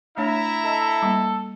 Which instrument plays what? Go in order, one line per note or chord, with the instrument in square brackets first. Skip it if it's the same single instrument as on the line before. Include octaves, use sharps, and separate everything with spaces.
[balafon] A3 D4 C#5 [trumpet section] E4 E5 A#5
[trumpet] A4 [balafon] D#5
[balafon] G3 A#3